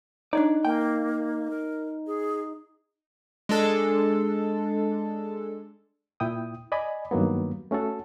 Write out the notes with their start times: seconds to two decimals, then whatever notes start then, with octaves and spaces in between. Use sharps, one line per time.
0.33 D4 D#4 C#5 D5
0.65 A#3 G5
1.50 A#4
2.07 G#4
3.49 G#3 D4 A4
6.20 A#2 E4 G5 D#6
6.72 D5 D#5 G#5 B5
7.11 G2 D#3 F#3 A#3 B3
7.71 A3 C#4 F#4 A4